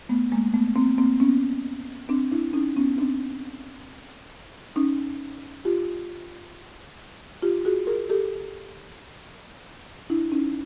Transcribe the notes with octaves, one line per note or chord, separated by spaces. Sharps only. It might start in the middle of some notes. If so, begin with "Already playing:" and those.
A3 B3
G#3 A#3
A3 B3
A#3 C4
A#3 C4
B3 C#4
C4 D4
D4 E4
C#4 D#4
B3 C#4
C4 D4
C#4 D#4
F4 G4
F4 G4
F#4 G#4
G#4 A#4
G4 A4
D4 E4
C#4 D#4